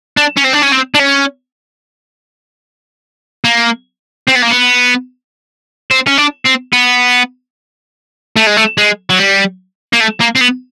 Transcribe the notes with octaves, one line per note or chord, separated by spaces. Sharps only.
D4
C#4
C4
D4
C#4
C4
D4
C#4
A#3
C4
B3
A#3
B3
C4
C#4
D4
C4
B3
A3
G#3
A3
G#3
F#3
G3
A#3
A3
A#3
C4
B3